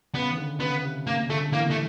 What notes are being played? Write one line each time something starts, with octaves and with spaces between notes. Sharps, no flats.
C#3 B3
D#3
D3
C#3 B3
C3
C#3 A#3
D3 A3
E3 A#3
A3